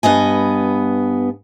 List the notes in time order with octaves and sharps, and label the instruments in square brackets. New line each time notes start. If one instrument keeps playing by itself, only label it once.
[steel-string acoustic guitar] G2 B3 D#5 G#5